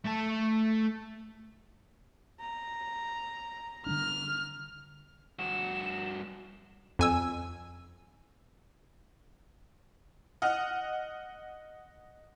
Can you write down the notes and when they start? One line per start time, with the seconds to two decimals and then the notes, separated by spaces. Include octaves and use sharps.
0.04 A3 A5
2.40 A#5
3.86 D3 G3 D4 F6
5.39 G2 F#4 E7
6.99 F2 G#5 E6
10.42 D#5 F#5 F6